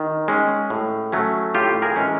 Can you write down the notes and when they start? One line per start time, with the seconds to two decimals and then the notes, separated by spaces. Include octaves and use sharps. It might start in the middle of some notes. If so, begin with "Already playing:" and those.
Already playing: D#3
0.28 G#3 C#4
0.70 A2
1.12 F#3 A3 C#4
1.54 A2 F4 G4
1.82 G#4 A#4
1.96 E3 G#3 C#4